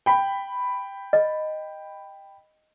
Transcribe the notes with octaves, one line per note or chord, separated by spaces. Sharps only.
G5 B5
D#5